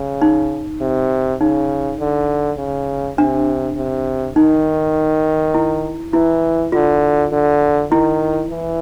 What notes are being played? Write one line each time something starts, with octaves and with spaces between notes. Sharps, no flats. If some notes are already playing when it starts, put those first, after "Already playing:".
Already playing: C#3
D#4
C3
C#3 D#4
D3
C#3
C3 D4
C3
D#3 D#4
E4
E3 E4
D3 F4
D3
D#3 E4
E3